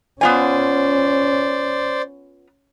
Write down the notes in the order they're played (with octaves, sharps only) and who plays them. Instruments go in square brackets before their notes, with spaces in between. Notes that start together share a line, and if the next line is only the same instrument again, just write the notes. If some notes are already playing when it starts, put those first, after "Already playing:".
[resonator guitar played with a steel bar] B3 F4 G#5 [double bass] C#4 [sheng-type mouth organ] C5 D5